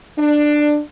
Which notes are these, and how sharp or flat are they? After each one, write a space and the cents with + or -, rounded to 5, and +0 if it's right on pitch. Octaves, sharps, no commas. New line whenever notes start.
D4 +15